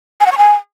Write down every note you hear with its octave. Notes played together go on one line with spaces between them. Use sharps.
G#5
F#5
C#6
G#5